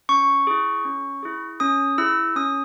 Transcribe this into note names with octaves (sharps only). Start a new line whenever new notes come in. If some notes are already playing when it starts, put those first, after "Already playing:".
C#4 C#6
E4 G#4
C#4
E4 G#4
C#4 D#6
E4 G#4 E6
C#4 D#6